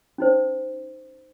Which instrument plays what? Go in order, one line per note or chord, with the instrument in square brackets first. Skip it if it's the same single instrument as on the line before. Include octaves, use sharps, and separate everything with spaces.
[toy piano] C#4 D#4 C5